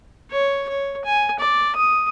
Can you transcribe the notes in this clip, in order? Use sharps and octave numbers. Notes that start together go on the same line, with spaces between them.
C#5
C#5
G#5
D5
D#6